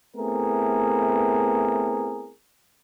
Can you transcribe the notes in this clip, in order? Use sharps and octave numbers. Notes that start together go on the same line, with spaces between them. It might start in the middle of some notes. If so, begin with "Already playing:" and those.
A3 B3 C4 E4 G#4 A#4